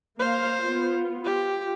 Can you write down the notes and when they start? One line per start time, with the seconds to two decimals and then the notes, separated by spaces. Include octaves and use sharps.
0.19 A#3 C5 F5
0.62 B3 F4
1.25 F4 G4